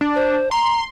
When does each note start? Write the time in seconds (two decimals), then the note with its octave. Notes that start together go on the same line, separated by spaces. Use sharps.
0.01 D4
0.15 C5
0.51 A#5 C6